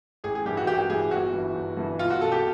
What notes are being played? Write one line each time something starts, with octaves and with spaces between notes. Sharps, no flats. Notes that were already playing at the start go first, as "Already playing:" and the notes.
A1 G#4
G#4
G2 E3 G4
F#4
A1 G4
G4
G2 E3 G#4
G1 F#4
G2 E3
G1
G2 E3
B1 F4
F#4
B2 A4
G4